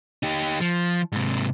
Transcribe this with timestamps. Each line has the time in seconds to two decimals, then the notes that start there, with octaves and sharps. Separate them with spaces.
0.23 D#4 G4
0.61 F3
1.12 G#2 C3